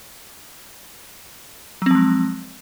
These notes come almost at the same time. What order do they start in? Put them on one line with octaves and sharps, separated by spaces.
F#3 C4 F3 G#3